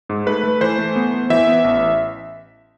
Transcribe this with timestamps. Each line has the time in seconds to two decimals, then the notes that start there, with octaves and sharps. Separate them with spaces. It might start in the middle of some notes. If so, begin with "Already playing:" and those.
0.09 G#2
0.26 A3 B4
0.44 A3
0.61 E3 C5
0.78 A3
0.96 B3
1.14 B3
1.30 E3 E5
1.47 B3
1.64 A1